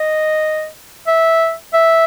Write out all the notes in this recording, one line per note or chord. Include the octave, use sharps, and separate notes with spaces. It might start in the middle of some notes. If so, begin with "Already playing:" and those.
Already playing: D#5
E5
E5